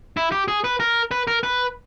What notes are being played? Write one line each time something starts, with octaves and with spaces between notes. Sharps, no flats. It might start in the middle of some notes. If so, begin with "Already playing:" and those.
E4
G4
G#4
B4
A#4
B4
A#4
B4